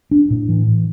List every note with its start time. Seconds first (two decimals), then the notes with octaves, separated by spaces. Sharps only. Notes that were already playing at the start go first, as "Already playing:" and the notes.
0.11 D4
0.30 A2
0.49 E3